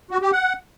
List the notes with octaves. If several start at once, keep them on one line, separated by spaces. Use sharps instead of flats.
F#4
G4
F#5